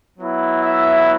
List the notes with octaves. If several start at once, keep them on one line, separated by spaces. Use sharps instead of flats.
F#3 B3 E4
E5